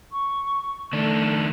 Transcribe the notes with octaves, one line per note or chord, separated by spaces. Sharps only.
C#6
D#3 A3 D4